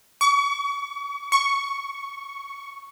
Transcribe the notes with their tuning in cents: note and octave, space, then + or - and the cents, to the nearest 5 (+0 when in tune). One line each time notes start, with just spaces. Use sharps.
C#6 +40
C#6 +0